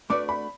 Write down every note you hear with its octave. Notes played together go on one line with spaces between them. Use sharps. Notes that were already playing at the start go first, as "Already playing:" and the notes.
A3 D4 F#4 B4 D5 D6
B5